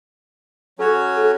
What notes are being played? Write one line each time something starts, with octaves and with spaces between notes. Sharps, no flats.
F#3 C#4 F#4 A4 C#5
A4